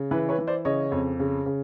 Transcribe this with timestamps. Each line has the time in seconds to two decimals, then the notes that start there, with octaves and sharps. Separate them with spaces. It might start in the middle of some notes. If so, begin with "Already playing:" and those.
Already playing: C#3
0.11 E3 B4
0.29 B4 C#5
0.39 E3
0.47 C5 D5
0.65 C#3 C#5 D#5
0.92 F2
1.19 C#3
1.46 C#3